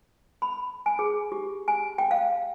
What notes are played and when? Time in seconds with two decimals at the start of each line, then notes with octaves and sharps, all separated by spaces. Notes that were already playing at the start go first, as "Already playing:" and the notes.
0.42 B5
0.86 G#5
0.99 G#4
1.32 G4
1.68 G#5
1.98 G5
2.11 F5